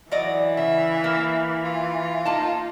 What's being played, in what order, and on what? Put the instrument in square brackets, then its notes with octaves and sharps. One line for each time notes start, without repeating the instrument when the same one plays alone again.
[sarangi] E3 [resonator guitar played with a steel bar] F#3 D5 D#5
[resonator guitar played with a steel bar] C#3 [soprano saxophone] E5
[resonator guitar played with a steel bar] A#3
[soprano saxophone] F4
[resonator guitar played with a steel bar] A#3 A5 [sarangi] D#4